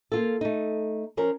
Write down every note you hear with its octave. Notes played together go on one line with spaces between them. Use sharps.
A#3 F4 A4
A3 D#4
F3 C#4 A#4